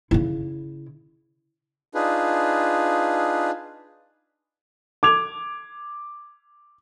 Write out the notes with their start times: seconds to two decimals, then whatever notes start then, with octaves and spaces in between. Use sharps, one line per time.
0.11 C#3 E4
1.95 D4 D#4 F4 G#4 B4
5.03 D6 G#6 F7